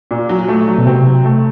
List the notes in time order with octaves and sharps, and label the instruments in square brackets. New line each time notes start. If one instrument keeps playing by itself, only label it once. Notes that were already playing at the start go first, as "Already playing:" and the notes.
[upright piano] A#2
F#3
A3
F#3
[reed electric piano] B2
[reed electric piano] C3 [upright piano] C4
[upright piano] F#3
A3